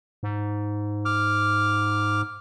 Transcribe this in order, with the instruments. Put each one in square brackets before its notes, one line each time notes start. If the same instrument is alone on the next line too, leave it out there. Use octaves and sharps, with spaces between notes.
[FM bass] G#2
[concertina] D6 F6